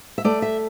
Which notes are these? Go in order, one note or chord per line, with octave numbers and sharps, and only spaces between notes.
E5
A3 D5
E5